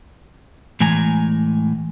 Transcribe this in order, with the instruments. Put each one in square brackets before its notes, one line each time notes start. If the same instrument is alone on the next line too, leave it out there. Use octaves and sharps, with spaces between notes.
[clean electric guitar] A2 E3 G#3 G#5 A#5